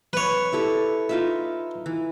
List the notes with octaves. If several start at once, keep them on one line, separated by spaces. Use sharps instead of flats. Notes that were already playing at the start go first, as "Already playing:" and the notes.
B4 C#5
E4 G4 A4
D#4 F4 E5
E3